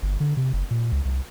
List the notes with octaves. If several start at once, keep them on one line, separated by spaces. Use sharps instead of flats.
G1
D3
C3
F#1
A#2
C#2
C2